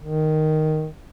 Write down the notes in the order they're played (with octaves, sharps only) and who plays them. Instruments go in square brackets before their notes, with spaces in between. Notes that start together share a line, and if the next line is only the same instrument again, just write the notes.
[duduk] D#3